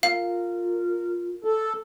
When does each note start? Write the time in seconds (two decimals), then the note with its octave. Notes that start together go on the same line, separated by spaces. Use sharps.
0.03 F4 A#4 F5
1.44 A4